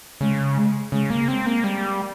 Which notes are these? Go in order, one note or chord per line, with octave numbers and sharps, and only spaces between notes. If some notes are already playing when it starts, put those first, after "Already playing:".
C#3 G#3
G#3
C#3 G#3
A#3
G#3 C4
A#3
G3